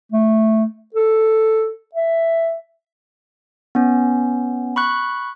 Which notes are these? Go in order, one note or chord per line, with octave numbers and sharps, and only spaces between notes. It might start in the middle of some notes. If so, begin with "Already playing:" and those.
A3
A4
E5
B3 C#4
B5 C#6 F#6